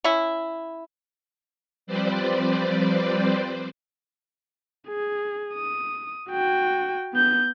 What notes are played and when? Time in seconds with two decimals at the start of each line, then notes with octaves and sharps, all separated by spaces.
0.04 C#4 E4
1.87 F3 G3 C4 B4 C5 D5
4.88 G#4
5.55 D#6
6.30 F#4 G5
7.14 B3 G6